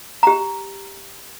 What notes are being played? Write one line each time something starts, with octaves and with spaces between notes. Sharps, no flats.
G4 A#5